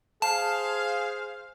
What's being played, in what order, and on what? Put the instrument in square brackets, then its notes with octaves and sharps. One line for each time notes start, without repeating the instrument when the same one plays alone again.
[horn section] G#4 C5 F5 [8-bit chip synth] A5